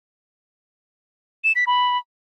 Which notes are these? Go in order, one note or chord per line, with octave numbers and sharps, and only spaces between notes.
E7
B6
B5